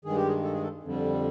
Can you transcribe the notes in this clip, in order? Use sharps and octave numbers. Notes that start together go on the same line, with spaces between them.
G2 D#3 G#3 G#4
G4
G#4
A4
G#4
A4
F2 D3 G3